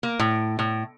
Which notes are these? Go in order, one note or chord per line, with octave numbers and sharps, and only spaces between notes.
A#3
A2
A2